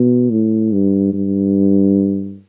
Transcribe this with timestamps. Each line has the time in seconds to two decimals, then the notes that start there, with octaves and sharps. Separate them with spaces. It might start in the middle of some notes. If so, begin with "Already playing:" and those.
Already playing: B2
0.31 A2
0.73 G2
1.14 G2